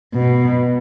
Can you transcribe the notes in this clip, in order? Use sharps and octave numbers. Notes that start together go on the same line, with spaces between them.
B2